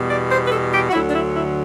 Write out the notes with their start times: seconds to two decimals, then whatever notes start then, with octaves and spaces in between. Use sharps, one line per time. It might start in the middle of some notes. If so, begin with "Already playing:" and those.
Already playing: E2 B2 G3
0.09 D5
0.30 C5
0.46 B4
0.51 A4
0.72 G4
0.89 F#4
0.93 D2 D3 F#3 E4
1.07 D4
1.14 E4
1.35 E4